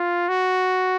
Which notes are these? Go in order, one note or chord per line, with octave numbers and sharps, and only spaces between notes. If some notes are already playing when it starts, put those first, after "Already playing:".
Already playing: F4
F#4